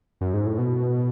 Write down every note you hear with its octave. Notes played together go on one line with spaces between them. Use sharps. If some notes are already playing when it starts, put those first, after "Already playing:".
F#2
G#2
A2
B2